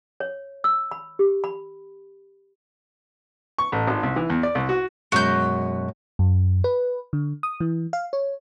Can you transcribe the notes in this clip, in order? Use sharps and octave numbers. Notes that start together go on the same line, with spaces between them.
C#5
E6
B5
G4
B5
C#6
A1
G#1
C2
E3
E2
D5
C2
F#4
F#2 B2 G#3 F#4 G6
F#2
B4
D3
D#6
E3
F5
C#5